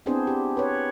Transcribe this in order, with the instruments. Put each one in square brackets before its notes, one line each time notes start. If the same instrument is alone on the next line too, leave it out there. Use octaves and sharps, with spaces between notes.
[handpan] B3 C4 D4 E4 G#4 C5
G4
B4 C#5